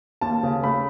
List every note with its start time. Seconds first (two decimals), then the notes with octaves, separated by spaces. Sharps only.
0.21 D#2 A5
0.43 C#3
0.63 A3 B5